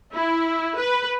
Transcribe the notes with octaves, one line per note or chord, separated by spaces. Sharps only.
E4
B4